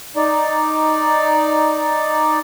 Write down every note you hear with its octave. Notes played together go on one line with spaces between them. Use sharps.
D#4 D5